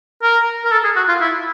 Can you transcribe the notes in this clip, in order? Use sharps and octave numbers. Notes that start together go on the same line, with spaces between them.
A#4
A#4
A4
G#4
F#4
F4
E4